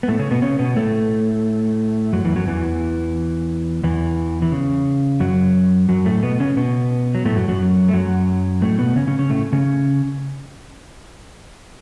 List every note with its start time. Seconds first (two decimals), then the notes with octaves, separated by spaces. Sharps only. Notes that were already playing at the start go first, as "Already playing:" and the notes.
0.03 B3
0.08 A2 A3
0.19 C#3 C#4
0.31 B2 B3
0.42 C#3 C#4
0.59 B2 B3
0.76 A2 A3
2.13 F#2 F#3
2.25 E2 E3
2.36 F#2 F#3
2.47 E2 E3
3.83 E2 E3
4.42 E3
4.52 C#3
5.20 F#2 F#3
5.89 F#2 F#3
6.05 A2 A3
6.23 B2 B3
6.40 C#3 C#4
6.57 B2 B3
7.15 F#3
7.25 A2 A3
7.36 F#2 F#3
7.48 F#2 F#3
7.89 A3
7.93 F#2 F#3
8.62 A2 A3
8.79 B2 B3
8.96 C#3 C#4
9.07 C#3 C#4
9.19 C#3 C#4
9.30 A2 A3
9.53 C#3 C#4